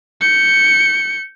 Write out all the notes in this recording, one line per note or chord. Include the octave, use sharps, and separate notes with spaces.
G6 C#7